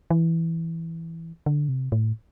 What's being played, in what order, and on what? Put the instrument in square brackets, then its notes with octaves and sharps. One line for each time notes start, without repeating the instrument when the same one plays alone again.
[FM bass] E3
D3
C3
A2